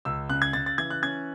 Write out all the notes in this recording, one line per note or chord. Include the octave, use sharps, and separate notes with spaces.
C#2 E6
C#3 F#6
G#6
C#3 A6
A6
E3 G#6
F#6
C#4 G#6